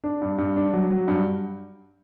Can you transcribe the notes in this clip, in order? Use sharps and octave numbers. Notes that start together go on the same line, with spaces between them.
D4
G2
G2
D4
F#3
F#3
G2